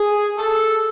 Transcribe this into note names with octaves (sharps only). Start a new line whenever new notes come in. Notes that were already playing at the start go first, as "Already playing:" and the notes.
Already playing: G#4
A4